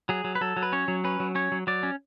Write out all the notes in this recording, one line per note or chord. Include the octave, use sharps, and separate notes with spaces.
F#3 G#4
F#3
B4
F#3 A4
F#3
B4
C#4 C#5
F#3
C#4 B4
F#3
C#4 C#5
F#3
F#3 D5
C#4